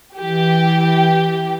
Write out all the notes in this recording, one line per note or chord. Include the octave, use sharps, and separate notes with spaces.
E3 G4